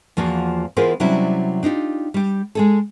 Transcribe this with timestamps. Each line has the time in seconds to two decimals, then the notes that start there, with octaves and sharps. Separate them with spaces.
0.17 E2 F3 A#3 F4 F#4
0.77 E3 B3 F4 G#4 A#4 C5
1.00 C3 F#3 G3 C#4 D4 E4
1.63 D4 D#4 F4 G4
2.14 G3 G4
2.55 G#3 G#4 A4